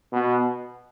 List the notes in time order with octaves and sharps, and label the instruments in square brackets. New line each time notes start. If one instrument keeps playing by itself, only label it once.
[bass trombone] B2